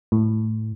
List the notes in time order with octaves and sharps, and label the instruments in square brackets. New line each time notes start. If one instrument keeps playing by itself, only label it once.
[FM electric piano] A2